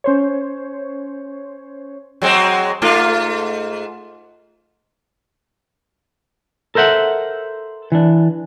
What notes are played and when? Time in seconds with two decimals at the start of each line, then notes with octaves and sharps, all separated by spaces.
0.04 C#4 C5 C#5
2.22 F#3 G#3 C4
2.82 G#2 A3 F4
6.75 A4 A#4 C5 E5 F#5
7.92 E3 D4